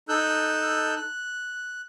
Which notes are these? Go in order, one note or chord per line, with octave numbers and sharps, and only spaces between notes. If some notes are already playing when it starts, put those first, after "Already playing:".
D#4 A4 E6 F#6 G6
F#6